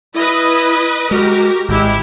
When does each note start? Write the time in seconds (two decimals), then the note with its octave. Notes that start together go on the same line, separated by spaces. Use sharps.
0.15 E4 B4 D#5
1.11 G#3 F#4 G4 A#4
1.68 G#1 G#3 E4 G4